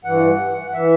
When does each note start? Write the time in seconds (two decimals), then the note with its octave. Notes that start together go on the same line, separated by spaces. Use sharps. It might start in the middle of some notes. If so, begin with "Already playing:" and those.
0.04 G2 E3 F#5
0.66 F#5
0.74 E3 E5